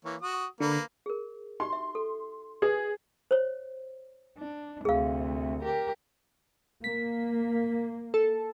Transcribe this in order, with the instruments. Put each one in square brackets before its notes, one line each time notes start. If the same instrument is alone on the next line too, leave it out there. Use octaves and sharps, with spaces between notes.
[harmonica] E3 A#3 C#5
F#4 D#6
[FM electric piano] D3 [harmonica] A#3 B4
[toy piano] G#4 A#4
[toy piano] D#4 F#4 G4 [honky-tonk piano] C6
[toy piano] E5
A4
[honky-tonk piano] G#4 [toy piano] B4 G#5 D#6
[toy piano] C5 C#5
[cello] D4
[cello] D2 C3 [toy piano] G#4 F5
[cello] G4 A#4
[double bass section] A#3 [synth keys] B6
[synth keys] A4